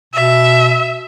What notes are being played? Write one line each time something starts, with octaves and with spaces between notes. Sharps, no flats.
B2 E5